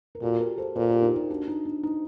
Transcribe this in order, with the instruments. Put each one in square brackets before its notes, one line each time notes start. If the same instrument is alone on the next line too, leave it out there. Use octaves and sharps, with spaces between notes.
[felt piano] A#4
[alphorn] A#2 [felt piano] F#4 A4
[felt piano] G4 A#4
A4 C5
[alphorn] A#2 [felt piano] A4 C5
[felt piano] G4 A#4
D#4 G4
D#4 G4
D4 F#4
D#4
D4
D#4